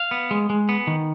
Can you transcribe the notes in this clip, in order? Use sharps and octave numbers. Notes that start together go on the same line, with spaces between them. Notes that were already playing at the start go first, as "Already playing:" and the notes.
Already playing: F5
B3
G#3
G#3
B3
D#3